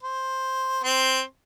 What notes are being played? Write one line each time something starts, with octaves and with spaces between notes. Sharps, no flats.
C5
C4 C6